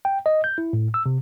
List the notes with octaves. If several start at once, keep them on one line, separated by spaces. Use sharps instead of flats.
G5
D#5
G6
E4
A2
E6
C3